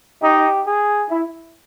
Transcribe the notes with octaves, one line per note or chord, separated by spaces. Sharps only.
D#4 G4
G#4
E4